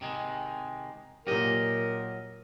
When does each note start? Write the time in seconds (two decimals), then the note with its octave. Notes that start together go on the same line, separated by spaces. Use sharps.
0.01 C3 D#3 G#3
1.27 A#2 F#3 G4 A#4 D#5